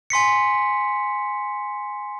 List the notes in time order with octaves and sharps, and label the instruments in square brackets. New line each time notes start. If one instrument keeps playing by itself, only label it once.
[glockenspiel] G#5 C6 B6 C#7